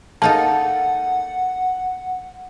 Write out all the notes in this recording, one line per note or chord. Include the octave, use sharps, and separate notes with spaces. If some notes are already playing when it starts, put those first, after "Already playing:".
A#3 D#4 A4 F#5 A5